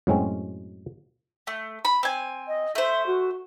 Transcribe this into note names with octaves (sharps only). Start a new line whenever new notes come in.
F#2 A2 F#3 G#3 C4 C#4
A3
B5
C4 G#5
D#5
A3 C5 E5
F#4